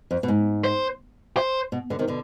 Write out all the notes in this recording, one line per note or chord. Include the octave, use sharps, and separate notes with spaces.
F2
B2
G#2
C5
C5
B2
B2 D3
C3 D#3
B2 D3